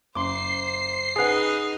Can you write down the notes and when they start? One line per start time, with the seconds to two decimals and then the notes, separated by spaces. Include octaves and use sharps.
0.15 F#1 C5 C6 D6 C7
1.16 D#4 G#4 B4 F#5 G#5